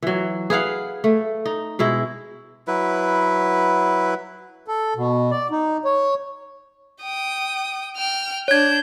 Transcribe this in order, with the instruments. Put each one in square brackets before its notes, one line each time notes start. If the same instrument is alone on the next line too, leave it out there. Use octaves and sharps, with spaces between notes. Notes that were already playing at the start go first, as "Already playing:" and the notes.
[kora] E3 F#3
G#4 B4 F5 F#5
A3
D#4
B2 G#3 E4
[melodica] F#3 E4 B4
[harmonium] A4
B2
D5
D#4
C#5
[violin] G5 D#6
G5 F6
[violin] D4 G6 [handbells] C#5 G#6